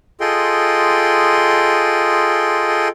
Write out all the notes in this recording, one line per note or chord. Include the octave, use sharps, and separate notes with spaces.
F4 G#4 A4 D#5 G5 C6